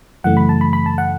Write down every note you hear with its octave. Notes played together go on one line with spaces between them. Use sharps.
F#2 C#3 E3 A3 F#5
B5
A5
B5
B5
A5
F#5